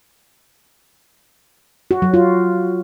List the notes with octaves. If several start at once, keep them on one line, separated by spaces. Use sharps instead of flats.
F#4
F#3
F4